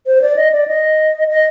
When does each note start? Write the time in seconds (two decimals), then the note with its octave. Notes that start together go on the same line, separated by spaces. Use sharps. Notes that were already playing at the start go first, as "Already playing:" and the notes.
0.07 C5
0.22 D5
0.36 D#5
0.52 D5
0.67 D#5
1.28 D#5